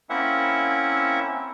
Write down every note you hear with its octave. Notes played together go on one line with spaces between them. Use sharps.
A#3 C4 C#4 E4 E5 F#5